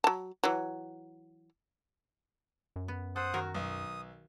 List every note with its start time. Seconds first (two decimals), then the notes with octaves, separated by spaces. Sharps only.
0.04 F#3 A5
0.44 E3 F#3
2.76 F#2
2.88 B3
3.16 A4 C5 F#5 D#6
3.34 D#3 F#3 F#4 A#4
3.55 B1 D#6